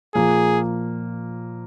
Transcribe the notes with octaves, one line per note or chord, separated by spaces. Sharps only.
A#2 F3 A#3 G#4